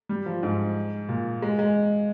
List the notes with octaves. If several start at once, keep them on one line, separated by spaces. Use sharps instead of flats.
G3
F3
G#2
A#2
G#3
G#3